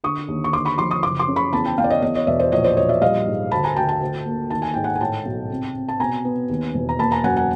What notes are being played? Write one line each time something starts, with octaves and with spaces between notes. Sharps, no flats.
D3 C#6 D#6
D#2
C#6
D3 C6 D6
B5 C#6
F3 C6 D6
C#6 D#6
F#1 C6 D6
C6 D6
C#3
B5 C#6
E2 A5 B5
G5 A5
E2 F5 G5
D5
C#5 D#5
E2 C#5 D#5
C#5 D#5
E1 D5 E5
C5 D5
A#1 C#5 D#5
C5 D5
A#1 C#5 D#5
D5 E5
G3 D#5 F5
G#2
D2 A5 B5
G#5 A#5
D2 G5 A5
G5 A5
D2
A#3
D#3 A5
G#5
G#2 G5
F#5 G#5
G#5
A2 G5 A5
B1
C3
C3
A5
B2 G#5 A#5
B3
D#2
E1
A#5
A#3 A5 B5
G#5 A#5
F#2 F#5 G#5
F#5 G#5